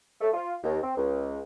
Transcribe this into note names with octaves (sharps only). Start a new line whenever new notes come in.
A3
F4
D#2
C4
C#2